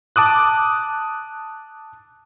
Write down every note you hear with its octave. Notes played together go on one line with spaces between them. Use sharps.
A5 D6 D#6 F#6